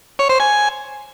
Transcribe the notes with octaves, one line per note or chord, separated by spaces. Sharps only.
C#5
C5
G#5